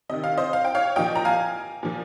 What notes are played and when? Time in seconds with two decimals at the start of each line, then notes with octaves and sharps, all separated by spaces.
0.09 C3 D#3 D#5
0.24 F5
0.38 C5 D#5
0.53 F5
0.65 G5
0.75 C#5 F5
0.96 A#2 F3 D#5 G5
1.16 A#5
1.25 F5 G#5
1.83 A#2 F3